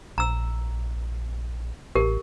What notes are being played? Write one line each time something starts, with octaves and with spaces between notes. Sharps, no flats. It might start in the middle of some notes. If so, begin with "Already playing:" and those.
A#1 A#5 E6
A1 G4 A#4